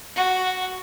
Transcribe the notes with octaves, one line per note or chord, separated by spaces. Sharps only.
F#4